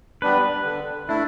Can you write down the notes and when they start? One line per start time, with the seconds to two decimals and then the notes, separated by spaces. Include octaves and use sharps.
0.22 G3 B3 D4 B4
0.65 D3
1.09 A3 D4 E4